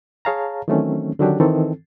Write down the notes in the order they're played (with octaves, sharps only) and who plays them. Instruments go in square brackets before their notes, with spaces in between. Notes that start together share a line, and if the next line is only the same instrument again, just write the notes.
[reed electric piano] G#4 C#5 F5 A5 A#5
D#3 E3 F#3 A3 C4 C#4
D3 D#3 F#3 C#4 D4 G4
D#3 E3 C4 A4